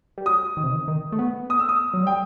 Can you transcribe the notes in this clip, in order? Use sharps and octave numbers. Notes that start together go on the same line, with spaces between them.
G3
F#3 D#6
D#3
C3
D#3
D#3
A3
B3
D#6
E6
D#6
F#3
G3 G5